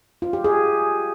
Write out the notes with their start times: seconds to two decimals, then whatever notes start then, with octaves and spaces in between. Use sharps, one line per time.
0.22 F4
0.33 G4
0.44 G#4